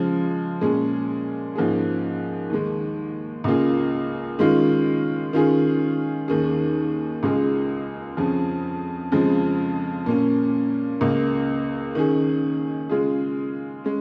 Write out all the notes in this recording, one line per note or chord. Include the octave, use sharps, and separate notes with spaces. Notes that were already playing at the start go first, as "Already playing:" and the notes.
Already playing: C#3 F3 G#3
A#2 G#3 C#4 G#4
G#2 F3 A#3 C#4 G#4
D#2 D#3 G#3
C#2 C#3 A#3 F4 G#4
D#3 G#3 C#4 F4
D#3 C#4 F4 G#4
D#2 D#3 C#4 G#4
C#2 C#3 G#3 F4 G#4
F2 C#3 F3 C#4 G#4
F2 C#3 F3 G#3
A#2 A#3 C#4
C#2 C#3 A#3
D#3 C#4 G#4
C#3 G#3 F4 G#4
G#3 C#4